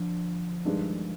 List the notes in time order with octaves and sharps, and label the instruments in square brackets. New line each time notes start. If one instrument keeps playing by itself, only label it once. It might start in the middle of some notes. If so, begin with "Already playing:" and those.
Already playing: [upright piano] D3 [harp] F3
[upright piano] G2 D#3 G#3 D4